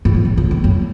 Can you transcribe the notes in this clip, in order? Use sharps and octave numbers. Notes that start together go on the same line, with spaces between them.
G#2
A2
A#2
A2
G2
F#2